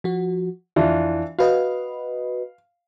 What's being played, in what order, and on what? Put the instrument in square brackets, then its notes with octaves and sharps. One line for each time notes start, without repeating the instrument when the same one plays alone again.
[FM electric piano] F3 F#4
[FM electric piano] F2 E4 [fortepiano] E3 D4 F4
[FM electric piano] F#4 B4 D#5 [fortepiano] F5